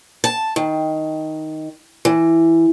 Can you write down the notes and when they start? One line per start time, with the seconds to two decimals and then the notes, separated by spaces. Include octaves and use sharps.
0.24 A5
0.56 D#3
2.05 E3